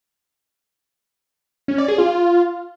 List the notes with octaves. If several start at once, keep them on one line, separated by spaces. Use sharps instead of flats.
C#4
D5
G#4
F4